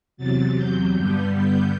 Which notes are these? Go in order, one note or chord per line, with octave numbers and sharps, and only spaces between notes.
E2 C3 F#3 A6
G6
G2 D3 G3 B3
G6